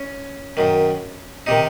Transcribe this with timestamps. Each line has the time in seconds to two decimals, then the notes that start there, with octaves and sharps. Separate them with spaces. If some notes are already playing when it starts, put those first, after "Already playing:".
Already playing: C#4
0.57 F#2 D#3
1.46 C3 D#3 D#4